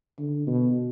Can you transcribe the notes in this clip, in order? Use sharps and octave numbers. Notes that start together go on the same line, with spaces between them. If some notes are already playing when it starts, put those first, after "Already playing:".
D3
B2